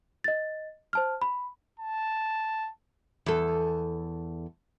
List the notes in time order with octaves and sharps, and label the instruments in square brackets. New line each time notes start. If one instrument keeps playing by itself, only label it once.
[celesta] D#5 A6
C5 A5 F6
B5
[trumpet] A5
[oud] E2 A4